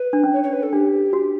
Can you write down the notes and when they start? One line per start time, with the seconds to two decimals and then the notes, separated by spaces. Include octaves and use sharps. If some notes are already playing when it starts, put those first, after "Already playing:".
Already playing: B4
0.13 D4
0.24 C#4
0.33 C#5
0.43 C#5
0.53 B4
0.63 A4
0.73 D4 G4
1.13 F#4